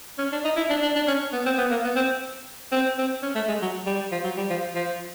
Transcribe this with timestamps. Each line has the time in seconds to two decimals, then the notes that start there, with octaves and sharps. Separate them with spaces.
0.19 C#4
0.32 D4
0.45 D#4
0.57 E4
0.70 D4
0.82 D4
0.96 D4
1.08 C#4
1.33 B3
1.46 C4
1.58 B3
1.71 A#3
1.84 B3
1.96 C4
2.72 C4
2.98 C4
3.23 C#4
3.35 A3
3.48 G#3
3.62 F#3
3.86 G3
4.12 F3
4.24 F#3
4.37 G3
4.50 F3
4.75 F3